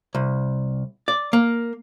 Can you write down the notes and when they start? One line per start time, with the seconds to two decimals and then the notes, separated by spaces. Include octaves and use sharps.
0.15 C2
1.08 D5
1.33 A#3